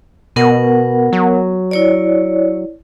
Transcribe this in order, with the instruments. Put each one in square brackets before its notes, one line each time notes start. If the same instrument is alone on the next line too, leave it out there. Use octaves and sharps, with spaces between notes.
[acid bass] B2 [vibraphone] B3 A#4 F#5
[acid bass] F#3
[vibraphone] E4 C#5 D5